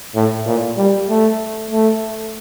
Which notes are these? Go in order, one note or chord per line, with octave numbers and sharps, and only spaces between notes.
A2
A#2
G3
A3
A3